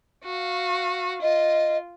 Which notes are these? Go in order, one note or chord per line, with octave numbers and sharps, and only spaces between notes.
F#4 F5
F4 D#5